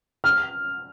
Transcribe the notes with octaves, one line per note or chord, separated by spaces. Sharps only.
F6